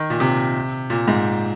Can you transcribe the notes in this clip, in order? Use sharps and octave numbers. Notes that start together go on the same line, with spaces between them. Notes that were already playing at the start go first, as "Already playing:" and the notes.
Already playing: D#3
A#2
C3
A#2
G#2